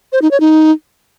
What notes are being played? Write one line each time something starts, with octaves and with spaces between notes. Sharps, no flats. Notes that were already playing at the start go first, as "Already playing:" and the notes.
C5
D#4
C#5
D#4